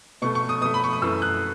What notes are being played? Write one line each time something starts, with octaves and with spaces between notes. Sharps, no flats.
B2 A3 C#6
C#6
D#6
B2 A3 D#6
B5
C#6
D#6
F#2 E3 A3 E6
F#6